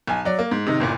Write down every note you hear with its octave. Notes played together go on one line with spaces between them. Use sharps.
B1 G#5
F#3 D5
A#3
G#2
C3 D#3 D#4
G1 C2 A#2